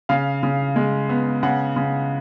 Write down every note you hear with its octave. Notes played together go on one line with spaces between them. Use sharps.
C#3 F5
C#3
G#3
B3
C#3 F#5
C#3